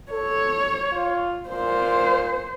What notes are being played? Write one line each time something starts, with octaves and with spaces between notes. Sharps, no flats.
A4 C#5
F4
A#2 C5